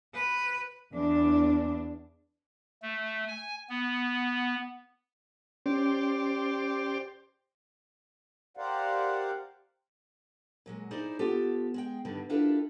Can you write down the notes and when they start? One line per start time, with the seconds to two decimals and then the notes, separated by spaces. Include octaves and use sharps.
0.14 B4
0.93 E2 D4
2.82 A3
3.28 G#5
3.69 B3
5.66 C#4 G4 C5 D5
8.57 G4 A#4 C5 D5 F5 F#5
10.66 A#2 F#3 G#3
10.91 D#4 E4 G#4 C5 D5
11.19 B3 F4 G4 A4
11.74 G#3 G#4 G5
12.05 G2 D3 D#3 G3
12.29 D4 E4 F4 G4 A4 A#4